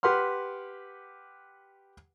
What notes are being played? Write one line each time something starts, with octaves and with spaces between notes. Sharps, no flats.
G4 B4 F#5 C6 F6